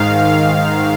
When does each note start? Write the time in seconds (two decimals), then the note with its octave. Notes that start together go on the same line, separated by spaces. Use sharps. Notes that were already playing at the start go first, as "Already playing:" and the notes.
Already playing: G#2 D#3 F5
0.29 F5